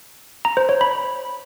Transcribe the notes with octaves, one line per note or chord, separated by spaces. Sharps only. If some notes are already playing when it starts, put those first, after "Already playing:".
A#5
C5
C#5
B5